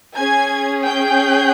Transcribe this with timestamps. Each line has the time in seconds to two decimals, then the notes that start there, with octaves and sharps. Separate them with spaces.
0.17 C#4 G#4 G#5 G#6
0.85 G5 G6